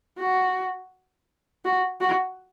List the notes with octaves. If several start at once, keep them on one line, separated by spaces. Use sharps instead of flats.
F#4
F#4
F#4